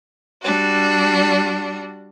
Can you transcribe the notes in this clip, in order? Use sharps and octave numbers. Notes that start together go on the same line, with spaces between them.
G3 D4 F#4